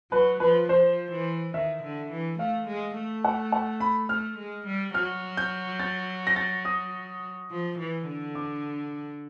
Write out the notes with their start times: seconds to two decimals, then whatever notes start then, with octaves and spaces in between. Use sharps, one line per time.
0.12 F#3 B4
0.40 F3 B4
0.69 F3 C5
1.11 E3
1.54 D#3 E5
1.83 D3
2.11 E3
2.39 A3 F5
2.67 G#3
2.96 A3
3.24 F#5
3.52 F#5
3.80 B5
4.09 A3 F6
4.38 G#3
4.67 G3
4.94 F#3 F6
5.37 G6
5.80 A6
6.27 A#6
6.36 A6
6.65 D#6
7.50 F3
7.79 E3
8.07 D3
8.35 D6